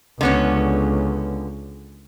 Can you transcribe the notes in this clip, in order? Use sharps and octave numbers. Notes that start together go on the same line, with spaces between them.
C#2 D3 B3 C#4